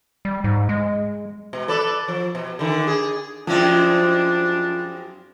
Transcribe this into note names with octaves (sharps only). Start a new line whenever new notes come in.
G3
G#2
G#3
B2
A4 B4 D5
F3
B2
D3 D#3
G#4
F#2 F3 G#3 C4 D4 E4